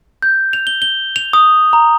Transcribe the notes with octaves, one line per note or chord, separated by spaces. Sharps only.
G6
F7
G7
G7
F7
D#6
A#5